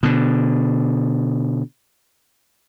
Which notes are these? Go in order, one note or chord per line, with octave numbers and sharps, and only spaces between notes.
B2 D3